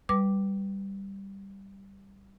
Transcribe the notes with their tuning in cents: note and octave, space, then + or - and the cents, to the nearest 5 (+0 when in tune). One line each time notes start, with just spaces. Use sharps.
G3 +0 B4 +0 D6 +0